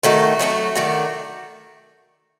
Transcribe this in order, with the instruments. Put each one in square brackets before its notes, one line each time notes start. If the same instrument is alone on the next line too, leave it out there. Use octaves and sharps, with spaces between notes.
[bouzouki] D#3 A3 D#4 F#4
F#3 A3 D#4 F#4
D#3 A3 D4 F#4